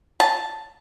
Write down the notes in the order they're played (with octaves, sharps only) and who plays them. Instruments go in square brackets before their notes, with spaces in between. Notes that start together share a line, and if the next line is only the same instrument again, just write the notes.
[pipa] A5